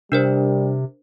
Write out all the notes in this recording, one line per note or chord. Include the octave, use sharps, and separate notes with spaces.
C3 G3 D4 A#4 C5